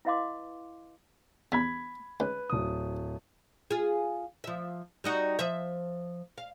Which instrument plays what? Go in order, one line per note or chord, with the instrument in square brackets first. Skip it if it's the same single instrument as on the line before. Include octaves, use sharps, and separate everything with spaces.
[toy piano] E4 B4 D#5 F5 C6 D6
[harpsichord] E2 [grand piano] B5 G#6 B6
[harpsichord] C#2 [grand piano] B4
[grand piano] D1 D#6
[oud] F4 G#4
F3 E5
G3 D#4 F#4
F3 E5
F5